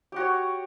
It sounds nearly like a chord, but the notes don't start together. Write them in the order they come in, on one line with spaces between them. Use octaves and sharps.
G4 F#4 C#5